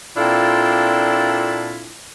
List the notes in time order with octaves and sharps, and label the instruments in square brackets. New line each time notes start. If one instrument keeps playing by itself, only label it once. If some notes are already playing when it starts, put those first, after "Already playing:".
[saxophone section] A#2 C4 D4 E4 F4 A4